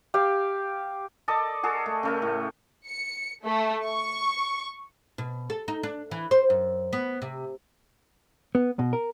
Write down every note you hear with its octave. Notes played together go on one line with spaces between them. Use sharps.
G4 F5
A4 D5 D#5 A5
F#4 G#4 A4
A3
C#3 A3 A#4
A2
C#7
A3
C#6
B2
A4
D#4
D4
E3
C5
F#2
B3
C3
B3
B2
A#4